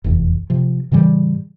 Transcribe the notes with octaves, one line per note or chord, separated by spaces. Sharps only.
F1 B1 E2
C3 F3
A2 C#3 E3 G3